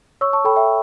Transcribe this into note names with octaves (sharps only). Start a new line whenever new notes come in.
C#5 C#6 E6
A5 C#6
A4 G5 B5
E5 G5